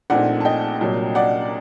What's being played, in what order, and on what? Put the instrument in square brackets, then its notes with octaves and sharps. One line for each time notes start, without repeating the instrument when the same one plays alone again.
[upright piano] A#1 A#2 A3 C4 D#4 D5 F#5
A5
D#5 G5
C2 A#2 F#3
D5 F#5